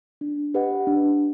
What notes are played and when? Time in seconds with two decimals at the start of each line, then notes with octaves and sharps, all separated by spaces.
0.21 D4
0.54 G4 B4 D#5 F#5
0.87 D4